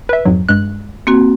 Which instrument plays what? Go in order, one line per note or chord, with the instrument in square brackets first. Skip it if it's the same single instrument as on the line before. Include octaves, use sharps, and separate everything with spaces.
[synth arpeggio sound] B4 E5
F2 G#2 F#3
G2 G#3 F#6
[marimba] A#3 C4 F#4